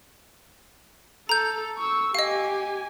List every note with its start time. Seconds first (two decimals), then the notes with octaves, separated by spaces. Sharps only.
1.29 A4 A#5 G6
1.78 C#6 E6
2.15 G4 D#5 F5 G#5